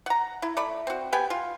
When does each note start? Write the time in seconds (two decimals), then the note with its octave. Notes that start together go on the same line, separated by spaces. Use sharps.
0.06 F#5 A#5
0.42 E4
0.57 A3 D5 B5
0.87 C4 F#4
1.13 B3 G4 G5 G#5
1.30 F4